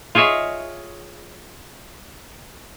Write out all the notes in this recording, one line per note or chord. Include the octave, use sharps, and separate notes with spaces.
F4 G#4 C#5 D#5 E5